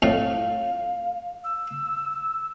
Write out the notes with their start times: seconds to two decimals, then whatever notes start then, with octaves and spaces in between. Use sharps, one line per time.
0.02 F2 A2 F5
1.44 E6